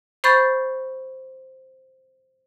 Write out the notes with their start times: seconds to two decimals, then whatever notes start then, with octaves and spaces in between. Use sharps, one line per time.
0.24 C5 B5 C#6 G6 A6